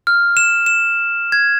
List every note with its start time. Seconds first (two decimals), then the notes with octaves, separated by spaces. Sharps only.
0.07 F6
0.37 E7
0.66 E7
1.32 G#6